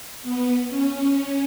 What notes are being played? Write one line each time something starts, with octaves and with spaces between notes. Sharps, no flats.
B3
C#4